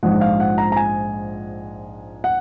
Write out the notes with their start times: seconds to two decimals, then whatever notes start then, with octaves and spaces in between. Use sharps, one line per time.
0.03 A#1 G#2 F3 G#3 F#5
0.21 F5
0.40 F#5
0.58 A#5
0.72 A#5
0.77 G#5
2.24 F#5